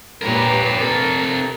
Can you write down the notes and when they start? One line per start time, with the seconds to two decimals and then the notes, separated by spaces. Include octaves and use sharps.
0.22 A#2 G4 A#4 B4 C#5
0.78 C3 A4 A#4